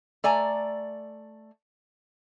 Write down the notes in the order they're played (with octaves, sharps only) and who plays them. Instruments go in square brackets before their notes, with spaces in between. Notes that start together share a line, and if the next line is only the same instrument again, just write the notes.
[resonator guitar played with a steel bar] A3 D5 G#5 A#5